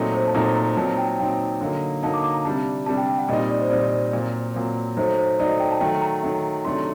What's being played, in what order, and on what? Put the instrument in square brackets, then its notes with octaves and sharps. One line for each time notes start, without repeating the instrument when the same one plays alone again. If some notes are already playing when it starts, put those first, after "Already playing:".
Already playing: [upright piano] A#2 F#3 A3 C4 D#4
[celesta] C5
A5
[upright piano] A#2 F#3 A3 C4 D#4 [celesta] A#5
[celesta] A#5
[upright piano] A#2 F#3 C4 D#4 [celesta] A5
[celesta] G5
[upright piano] A#2 F#3 C4 D#4 [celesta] G5
[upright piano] D3 F#3 A#3 D#4
[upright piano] D3 F#3 A#3 D#4 [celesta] A5
[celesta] D6
D6
A#5
[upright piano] C3 G3 D4 [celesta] A5
[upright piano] C3 G3 D4 [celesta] A5
[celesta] G5
G5
F#5
[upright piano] A#2 G3 C4 D#4 [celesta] D#5
[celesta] D5
C5
[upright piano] A#2 G3 C4 D#4 [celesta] D5
[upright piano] A#2 F#3 C4
A#2 F#3 C4
[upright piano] F#3 A3 D#4 [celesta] C5
[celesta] C5
[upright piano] F#3 A3 D#4 [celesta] D5
[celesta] D#5
G5
A5
[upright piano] D#3 F#3 A3 [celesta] G5
[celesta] A#5
[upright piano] D#3 F#3 A3
[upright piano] C3 D#3 F#3 A3 D4 [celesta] C6